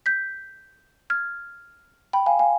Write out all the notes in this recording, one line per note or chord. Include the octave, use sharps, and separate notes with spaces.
G6 B6
F6 G#6
G5 B5
F5 G#5
F5 G#5